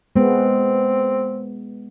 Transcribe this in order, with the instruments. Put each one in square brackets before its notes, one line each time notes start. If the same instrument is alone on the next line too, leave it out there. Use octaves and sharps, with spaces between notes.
[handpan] G#3 B3 [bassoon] C4